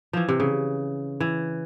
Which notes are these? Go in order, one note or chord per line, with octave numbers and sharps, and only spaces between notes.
E3 F3
C3
C#3
E3